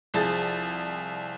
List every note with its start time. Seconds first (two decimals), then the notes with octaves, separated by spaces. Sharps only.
0.14 C2 F3 G#4 A5 A6